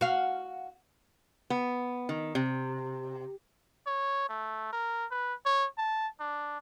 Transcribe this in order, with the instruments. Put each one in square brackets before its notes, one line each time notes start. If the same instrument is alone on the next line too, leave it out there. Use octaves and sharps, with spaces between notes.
[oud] F#4 F5
[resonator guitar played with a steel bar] B3
D#3
C3
[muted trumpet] C#5
A3
A#4
B4
C#5
A5
D4